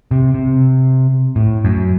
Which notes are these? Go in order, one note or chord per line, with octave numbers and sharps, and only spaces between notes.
C3
C3
A2
F#2